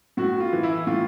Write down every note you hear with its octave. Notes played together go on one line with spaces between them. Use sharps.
A2 F#4
F4
E3
E4
A2 F4